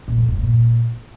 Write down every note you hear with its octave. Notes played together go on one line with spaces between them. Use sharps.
A#2
F2
G#2
A#2